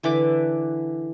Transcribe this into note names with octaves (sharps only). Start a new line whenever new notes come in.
D3 E3 B4 D6